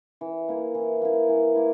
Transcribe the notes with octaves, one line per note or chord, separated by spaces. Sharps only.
E3
A#3 E4
E3
A#3 E4
E3
A#3 E4